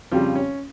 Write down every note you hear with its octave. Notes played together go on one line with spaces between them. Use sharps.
F2 C#3 F3 G3 F4
C#4